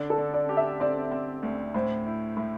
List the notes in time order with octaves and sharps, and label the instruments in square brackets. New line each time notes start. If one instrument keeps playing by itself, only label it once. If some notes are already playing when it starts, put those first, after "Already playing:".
Already playing: [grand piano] D3 [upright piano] D5
[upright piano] A4
[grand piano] D3
[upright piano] D5
[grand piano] G4
[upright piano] E5
[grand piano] C4 [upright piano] D5
[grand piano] C4
D2
[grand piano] A2 [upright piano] C5
[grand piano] E4
A2